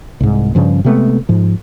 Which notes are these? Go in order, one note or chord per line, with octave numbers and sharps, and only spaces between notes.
C2 G#2
G2 C#3 F3
C3 G#3 A3 B3
G#2 F3